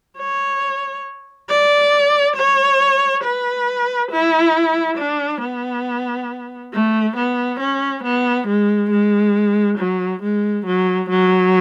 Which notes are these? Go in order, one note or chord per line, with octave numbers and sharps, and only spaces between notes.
C#5
D5
C#5
B4
E4
D4
B3
A3
B3
C#4
B3
G#3
G#3
F#3
G#3
F#3
F#3